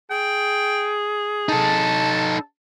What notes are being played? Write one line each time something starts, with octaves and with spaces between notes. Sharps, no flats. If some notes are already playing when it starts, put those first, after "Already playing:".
G#4 G5
D#4 A4 A5